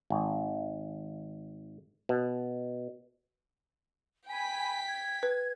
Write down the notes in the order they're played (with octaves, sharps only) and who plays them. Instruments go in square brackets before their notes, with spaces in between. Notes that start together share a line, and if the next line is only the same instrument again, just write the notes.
[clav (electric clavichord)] G#1
B2
[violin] G5 B6 [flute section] G#5 B5
[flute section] G#6
[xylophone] B4